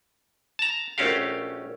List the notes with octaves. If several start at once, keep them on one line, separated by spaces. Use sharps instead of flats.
A5 A#5
A#1 A3 C#4 F#4 G4 F5